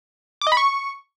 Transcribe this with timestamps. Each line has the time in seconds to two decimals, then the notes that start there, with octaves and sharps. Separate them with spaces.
0.41 D6
0.47 D#5
0.52 B5
0.57 C#6